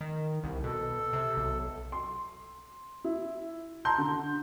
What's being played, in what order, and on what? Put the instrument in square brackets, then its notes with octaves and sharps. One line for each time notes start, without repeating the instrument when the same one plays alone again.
[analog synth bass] D#3
C2
[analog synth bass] B2 [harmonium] A4
[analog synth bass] C3
B1
[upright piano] C6
E4
A5 A#5 C6 G6
D3